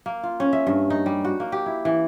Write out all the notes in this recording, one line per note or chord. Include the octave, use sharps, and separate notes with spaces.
A#3
F4
C#4
E5
G2
D#4
G3
F#4
A#3
G4
E4
E3